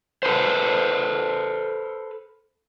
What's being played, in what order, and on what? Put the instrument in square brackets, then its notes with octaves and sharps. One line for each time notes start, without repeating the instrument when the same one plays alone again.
[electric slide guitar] A4 B4 C5